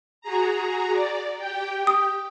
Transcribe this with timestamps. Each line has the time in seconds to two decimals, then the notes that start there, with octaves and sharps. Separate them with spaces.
0.21 F#4 G#4 A#5
0.93 D5
1.37 G4 G5
1.87 D#6